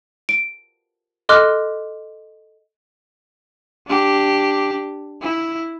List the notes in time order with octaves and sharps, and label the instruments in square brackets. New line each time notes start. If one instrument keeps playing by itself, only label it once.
[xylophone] D7
A4 D#5 C6 D6 F6 F#6
[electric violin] D4 G4
E4